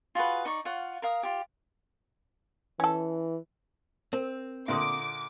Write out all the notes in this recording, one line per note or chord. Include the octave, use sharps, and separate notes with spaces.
F4 F#4 G#4 B4
D#4 D5 C#6
F4 C#5 F5 F#5
A#4 F5 D#6
F4 G4
E3 C#4 A4
C4 A#4
A#2 D3 A#3 E5 C6 D6 D#6